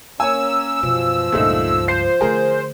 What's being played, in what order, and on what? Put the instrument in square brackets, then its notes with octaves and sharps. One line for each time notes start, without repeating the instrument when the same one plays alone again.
[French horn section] A#3 C#4 [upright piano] C#5 G#5 [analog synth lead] E6
[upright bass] F#2 B2 [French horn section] F3
[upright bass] C#2 G2 [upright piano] A#2 A3 D#4
[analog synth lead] C5 [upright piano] C7
[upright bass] D3 A3 [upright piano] G#4 A#4